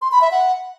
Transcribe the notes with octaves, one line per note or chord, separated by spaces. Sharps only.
C6
B5
E5
F#5